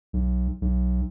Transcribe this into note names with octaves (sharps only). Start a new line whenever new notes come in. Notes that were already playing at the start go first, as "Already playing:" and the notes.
B1
B1